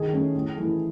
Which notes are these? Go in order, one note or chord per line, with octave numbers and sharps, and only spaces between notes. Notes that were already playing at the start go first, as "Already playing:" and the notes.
Already playing: D#3 G#4
A3 C#4
A2
E3 A3